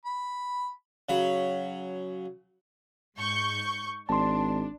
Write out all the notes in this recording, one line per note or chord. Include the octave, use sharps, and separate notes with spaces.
B5
C#3 F#3 B5
G#2 C#6 G6
G#1 D4 A5 C6